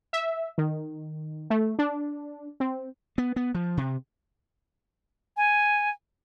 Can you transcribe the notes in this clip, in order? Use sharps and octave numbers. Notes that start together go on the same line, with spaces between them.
E5
D#3
A3
D4
C4
B3
B3
F3
C3
G#5